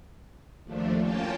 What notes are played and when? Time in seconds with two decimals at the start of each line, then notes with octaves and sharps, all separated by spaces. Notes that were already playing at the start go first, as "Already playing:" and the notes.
0.64 D#2 F3 A3 D4
0.98 A#3 C#4 F4 G5 A5